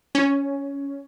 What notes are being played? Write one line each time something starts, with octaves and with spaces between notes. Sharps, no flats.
C#4